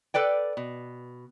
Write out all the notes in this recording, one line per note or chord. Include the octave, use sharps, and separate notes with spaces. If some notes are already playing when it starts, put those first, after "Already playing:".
A4 B4 D5 G5
B2